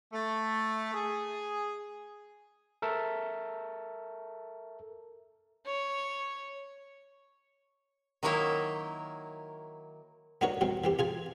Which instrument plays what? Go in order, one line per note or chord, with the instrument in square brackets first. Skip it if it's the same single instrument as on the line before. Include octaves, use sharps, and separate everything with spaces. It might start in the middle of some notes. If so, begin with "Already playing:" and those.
[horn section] A3
G#4
[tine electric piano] A4 A#4 E5 A5
[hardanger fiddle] C#5
[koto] D#3 F#3 A#3 E4 C#5
[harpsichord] B3 D4 D#4 F#4 A#4 C#5
B2 F#3 C4
E3 C4 G4
F4 G#4 G#5